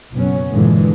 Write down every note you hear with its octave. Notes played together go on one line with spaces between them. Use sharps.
F#1 B2 F#3 C#4
G2 A#2 D3 E3 G#3